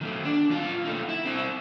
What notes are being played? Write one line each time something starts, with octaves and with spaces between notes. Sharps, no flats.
D#3 A3
D4
D#2 F4
A3 D#4
E4
C4 E4